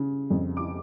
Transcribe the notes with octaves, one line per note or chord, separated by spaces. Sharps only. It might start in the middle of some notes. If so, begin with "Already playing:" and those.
Already playing: C#3
F2
D6